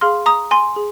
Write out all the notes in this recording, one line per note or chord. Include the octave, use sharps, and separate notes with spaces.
G#4 F5 C6 F6
A#5 D#6
G#5 C6
G#4